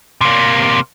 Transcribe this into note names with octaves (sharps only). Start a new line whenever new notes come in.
C3 A#3